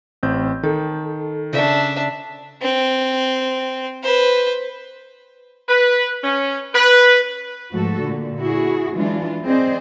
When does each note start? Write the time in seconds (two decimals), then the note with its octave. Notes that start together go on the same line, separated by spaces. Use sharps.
0.23 A1 C4 G6
0.63 D#3 A4
1.53 C#3 D4 D5 E5
2.62 C4
4.03 B4 C5
5.69 B4
6.23 C#4
6.74 B4
7.73 G#2 F3 A3 F#4 A4
8.03 A#2 D3
8.39 E4 F#4 G#4
8.96 E3 F#3 G#3 D4 F4
9.44 C4 G#4 C5 D5 D#5